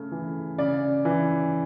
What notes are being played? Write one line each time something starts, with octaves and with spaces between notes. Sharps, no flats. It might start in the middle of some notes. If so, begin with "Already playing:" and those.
Already playing: C#3 A3
E3
C#3 D5
E3